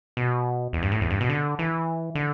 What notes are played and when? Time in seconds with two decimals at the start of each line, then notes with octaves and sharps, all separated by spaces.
0.17 B2
0.73 E2
0.83 G2
0.92 A2
1.01 E2
1.11 G2
1.21 B2
1.29 D3
1.59 E3
2.15 D3